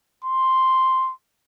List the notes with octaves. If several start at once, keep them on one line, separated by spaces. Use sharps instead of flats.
C6